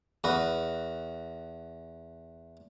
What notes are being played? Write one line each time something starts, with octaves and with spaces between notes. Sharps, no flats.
E2 F#4 B4